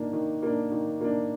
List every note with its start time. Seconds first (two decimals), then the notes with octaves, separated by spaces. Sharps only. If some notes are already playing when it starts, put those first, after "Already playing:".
Already playing: D#3 A#3 D4
0.13 D#3
0.42 A#3 D4
0.72 D#3
1.01 A#3 D4